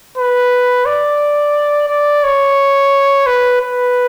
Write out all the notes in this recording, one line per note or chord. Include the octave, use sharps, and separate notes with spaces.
B4
D5
D5
C#5
B4
B4